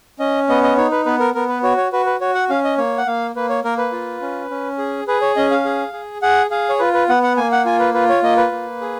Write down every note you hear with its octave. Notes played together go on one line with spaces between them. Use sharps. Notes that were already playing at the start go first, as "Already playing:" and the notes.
C#4 D#5
B3 D#5
D#5
D#4 C#5
B4
B3 B4
A#4
B3 A#4
B4
F#4 C#5
C#5
F#4 B4
B4
F#4 C#5
F#5
C#4 F5
D#5
A#3 C#5
F#5
A#3 F5
A#3 B4
C#5
A#3 A#4
B4
F4
C#4
C#4
G#4
G#4 B4
C#5
C#4 D#5
F5
G#4
G#4
G#4 F#5
G#4 F5
C#5
F4 B4
B4
B3 F#5
F#5
A#3 G#5
F#5
F4 G#5
B4
F4 B4
C#5
A#3 D#5
B4
A#3
G#4